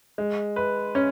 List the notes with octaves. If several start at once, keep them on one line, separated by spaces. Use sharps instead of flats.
G#3
B4
C#4